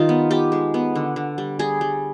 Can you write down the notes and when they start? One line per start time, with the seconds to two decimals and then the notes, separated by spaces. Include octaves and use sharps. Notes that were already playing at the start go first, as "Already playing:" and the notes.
Already playing: D#3 G3 D#4 F4
0.09 B3
0.31 B3 G4
0.52 G#3
0.74 B3
0.95 D3
1.16 D3
1.38 G3
1.59 G3 G#4
1.81 G3